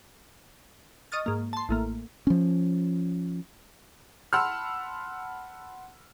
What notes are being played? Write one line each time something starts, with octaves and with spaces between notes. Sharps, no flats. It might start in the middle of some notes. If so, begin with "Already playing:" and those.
D#5 C#6 D#6 F6 A6
G#2 A#3
A5 C6
A1 A2 A#3
F3 C#4
F#5 A5 B5 C6 E6 F6